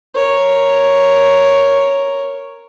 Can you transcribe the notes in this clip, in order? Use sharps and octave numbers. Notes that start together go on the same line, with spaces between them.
A#4 C#5